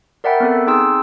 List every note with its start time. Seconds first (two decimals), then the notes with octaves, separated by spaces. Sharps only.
0.24 A#4 D5 E5 F#5 G5 B5
0.40 B3 C4 A4
0.67 C4 D#4 G#4 G5 C6 E6